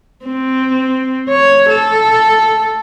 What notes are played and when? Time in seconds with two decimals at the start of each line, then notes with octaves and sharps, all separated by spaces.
0.25 C4
1.29 C#5
1.69 A4